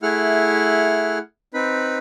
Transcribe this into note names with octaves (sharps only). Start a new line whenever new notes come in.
A3 E4 G#4 F#5 F6
C4 D#4 B4 B5